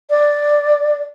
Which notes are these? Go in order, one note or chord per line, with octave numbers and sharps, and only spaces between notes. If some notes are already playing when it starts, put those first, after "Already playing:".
D5